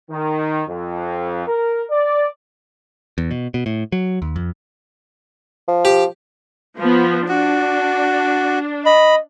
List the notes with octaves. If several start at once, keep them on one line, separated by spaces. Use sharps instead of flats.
D#3
F2
A#4
D5
E2
B2
B2
A2
F#3
D#2
F2
F3
G4
F3 B3
D4 F#4
D#5 B5